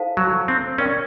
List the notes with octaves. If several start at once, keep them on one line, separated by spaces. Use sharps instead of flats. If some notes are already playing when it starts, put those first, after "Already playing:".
Already playing: E4 A4 C5 F5 A5
F#3
C4
C#4 A#4 D5 G5